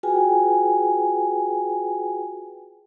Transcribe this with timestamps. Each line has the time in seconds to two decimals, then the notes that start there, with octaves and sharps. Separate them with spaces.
0.03 F4 F#4 G#4 B4 G5 G#5